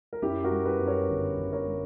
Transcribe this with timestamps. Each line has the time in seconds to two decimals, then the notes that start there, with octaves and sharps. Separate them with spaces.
0.13 A#4
0.22 F#2 E4 G4
0.44 F#4 A#4
0.51 G3
0.66 G4 B4
0.80 F#2
0.87 A#4 C#5
1.09 G1
1.38 G1
1.52 A#4 C#5
1.67 G3